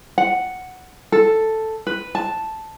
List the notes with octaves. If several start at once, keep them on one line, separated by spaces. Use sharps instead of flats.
F#5
A4
B4
A5